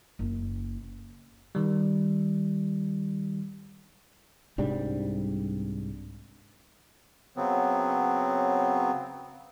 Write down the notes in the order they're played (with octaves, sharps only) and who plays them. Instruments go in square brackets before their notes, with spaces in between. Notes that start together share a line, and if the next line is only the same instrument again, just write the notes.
[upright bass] F#1
[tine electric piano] D#3 G3
[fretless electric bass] C2 G#2 G3 D4
[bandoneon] C#3 F#3 B3 C4